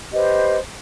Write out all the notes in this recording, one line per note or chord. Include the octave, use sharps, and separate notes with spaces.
G4 B4 C5 D#5